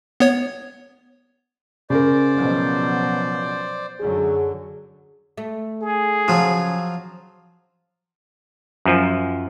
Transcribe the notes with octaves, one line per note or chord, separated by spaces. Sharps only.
B3 C#5
C#3 A#4 C5 D5
B2 F3 F#3
F#2 D3 F#3 G#4
A3
G#4
C#3 F3 F#3 F4
F#2 F3